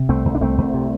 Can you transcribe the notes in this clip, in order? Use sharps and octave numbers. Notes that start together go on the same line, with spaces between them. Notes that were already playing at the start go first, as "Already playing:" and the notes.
Already playing: C3
C2 A3 C4
C2
D4
C2 A3 C4
C2
C3